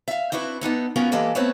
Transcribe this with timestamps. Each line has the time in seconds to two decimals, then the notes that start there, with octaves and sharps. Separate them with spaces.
0.08 E5 F5
0.32 C4 D4 E4 F#4 B4
0.61 B3 D4 D#4 A4
0.96 B3 C#4 F4 F#4 A#4 B4
1.12 E3 G#3 A#3 G4 A4 B4
1.35 A3 B3 C4 F#4 B4 C#5